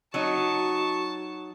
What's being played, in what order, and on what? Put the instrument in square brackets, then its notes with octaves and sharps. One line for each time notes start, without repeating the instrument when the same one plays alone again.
[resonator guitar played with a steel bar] F#3 D#4 [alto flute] F#4 [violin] A5 [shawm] C#6